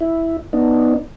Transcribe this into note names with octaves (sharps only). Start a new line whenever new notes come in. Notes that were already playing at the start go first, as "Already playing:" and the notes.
E4
B3 D4 D#4